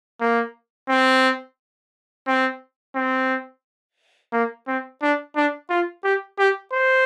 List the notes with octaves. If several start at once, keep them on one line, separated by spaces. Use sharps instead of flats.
A#3
C4
C4
C4
A#3
C4
D4
D4
F4
G4
G4
C5